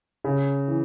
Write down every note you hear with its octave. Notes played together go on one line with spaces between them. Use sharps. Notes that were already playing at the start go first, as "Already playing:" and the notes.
C#3
E3